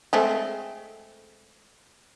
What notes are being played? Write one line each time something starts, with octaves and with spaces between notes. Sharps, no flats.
G#3 A3 C4